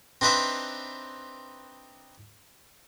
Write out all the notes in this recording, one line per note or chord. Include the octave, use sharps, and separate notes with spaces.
C4 D4 D#4 B4 C5 E5